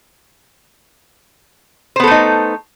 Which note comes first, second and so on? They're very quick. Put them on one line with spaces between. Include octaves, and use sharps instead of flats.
C5 B3 A4 A3 D#4